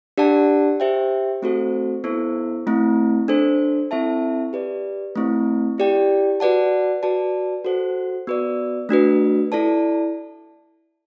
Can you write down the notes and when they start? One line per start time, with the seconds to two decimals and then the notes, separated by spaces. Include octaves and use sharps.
0.18 D4 G4 D5 F#5 A5
0.80 G4 C5 E5 G5
1.42 A3 C4 F#4 A4 C5
2.04 B3 E4 A4 C5
2.67 A3 C4 E4
3.28 D4 A4 C5
3.91 C4 E4 A4 E5 A5
4.53 G4 B4 D5
5.16 A3 C4 E4
5.78 E4 G4 D5 G5
6.40 F#4 B4 D5 F#5 A5
7.03 F#4 B4 D5 A5
7.65 F#4 A4 C5 F#5
8.27 B3 F#4 B4 D5
8.89 A3 D4 F#4 B4
9.52 E4 A4 D5 A5